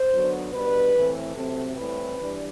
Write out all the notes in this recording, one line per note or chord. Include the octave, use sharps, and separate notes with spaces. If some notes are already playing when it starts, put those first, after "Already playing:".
Already playing: C5
D3 F#3 B3 D4
B2 G3 D4 B4
A2 E3 A3 C4
C3 F#3 A3 C4 A4
A2 E3 G3 C4 B4
E3 G3 D4